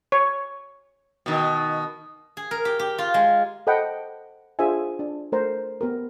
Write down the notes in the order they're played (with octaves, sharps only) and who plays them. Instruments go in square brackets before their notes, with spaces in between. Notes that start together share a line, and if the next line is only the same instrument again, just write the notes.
[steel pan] C#5
[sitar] B2 D#3
[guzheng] G#4
A#4
G4
G4
F4
G#3
[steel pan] A4 C5 D#5 F#5 G5 B5
D4 F4 G#4 C5 E5 G#5
D4
A3 A#4 C5 A#5
B3 G4 A#4